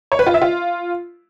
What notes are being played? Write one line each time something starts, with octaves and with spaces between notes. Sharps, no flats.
C#5
B4
F4
E5
F4